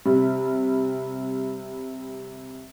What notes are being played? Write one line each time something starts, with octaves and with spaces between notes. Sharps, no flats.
C3 G3